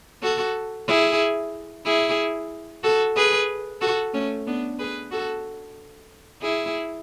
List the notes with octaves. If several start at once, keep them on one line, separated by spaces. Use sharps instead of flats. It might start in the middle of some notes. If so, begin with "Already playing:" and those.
F#4 A4
E4 G#4
E4 G#4
F#4 A4
G#4 B4
F#4 A4
A3 C#4
B3 D4
G#4 B4
F#4 A4
E4 G#4